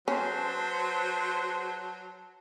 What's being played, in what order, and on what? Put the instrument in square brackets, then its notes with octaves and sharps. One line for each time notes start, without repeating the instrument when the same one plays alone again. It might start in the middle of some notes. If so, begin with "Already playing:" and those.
[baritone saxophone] F#3 [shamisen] C#4 [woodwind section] G#4 B4 C5 [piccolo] A5